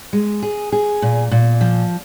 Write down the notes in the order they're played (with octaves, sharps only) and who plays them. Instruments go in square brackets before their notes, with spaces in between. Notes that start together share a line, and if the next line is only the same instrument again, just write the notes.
[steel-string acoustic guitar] G#3
G#4
G#4
A#2
A#2
F3